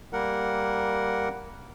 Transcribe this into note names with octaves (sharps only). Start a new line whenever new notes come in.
G3 A#3 A#4 F#5